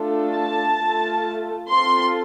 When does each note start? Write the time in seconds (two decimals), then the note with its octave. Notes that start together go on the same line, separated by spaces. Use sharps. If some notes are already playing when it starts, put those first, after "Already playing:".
Already playing: A3 D4 F4 A4
0.36 A5
0.80 A3 F4 A4
1.70 C4 F4 A4 C6